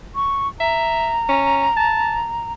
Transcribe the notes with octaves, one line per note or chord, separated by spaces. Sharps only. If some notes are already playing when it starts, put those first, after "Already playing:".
C#6
E5 A#5
C#4
A5